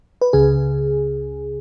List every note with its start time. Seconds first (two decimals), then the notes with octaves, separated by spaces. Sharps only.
0.21 B4
0.33 C#2 C#3 G#4